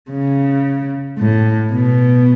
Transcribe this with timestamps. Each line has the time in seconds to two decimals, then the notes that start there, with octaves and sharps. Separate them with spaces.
0.11 C#3
1.19 A2
1.72 B2